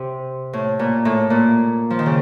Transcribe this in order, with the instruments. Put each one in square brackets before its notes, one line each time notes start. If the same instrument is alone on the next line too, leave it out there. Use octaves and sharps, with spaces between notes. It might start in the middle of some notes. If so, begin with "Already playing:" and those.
Already playing: [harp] C3
A2
A#2
A2
A#2
F3
D#3
C#3